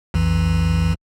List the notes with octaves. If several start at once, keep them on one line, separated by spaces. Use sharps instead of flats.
B1 F2 E3